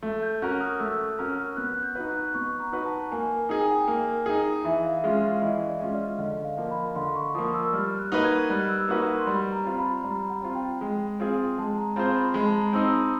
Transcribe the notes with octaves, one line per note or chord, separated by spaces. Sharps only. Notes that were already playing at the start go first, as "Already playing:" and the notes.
A3
G6
C#4 F#4 A#4 F#6
D#6
A3 E6
C#4 F#4 A#4 F6
B3 F#6
G6
D#4 F#4 B4
F#6
B3 C#6
A#5
D#4 F#4 B4
A5
A#3 G#5
D#4 G#4 G#5
G5
F#5
G5
A#3
D#4 G#4
E3 E5
F5
G#3 C#4 F4 E5
F5
E3 D#5
D5
G#3 C#4 F4
D5
D3 D#5
F5
F3 A#3
B5
D3 C6
C#6
F3 A#3 D#6
E6
G3 F6
F#6
A#3 D#4 F#4 B4
G#6
G3 F#6
E6
A#3 D#4 F#4 B4 D#6
C6
G3 B5
A#5
C4 F4
B5
G3 A#5
F#5
C4 F4
G5
G#3 G5
C4 F4 G#4 C5
G#3 A5
A#5
C4 F4 G#4 C5 B5
B5
G#3 B5
A5
A#5
C4 D#4 E6
D#6